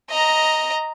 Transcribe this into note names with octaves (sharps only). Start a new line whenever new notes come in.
D#5 A#5